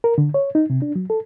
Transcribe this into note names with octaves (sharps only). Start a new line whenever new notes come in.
A#4
D3
C#5
D#4
C3
D4
F#3
A4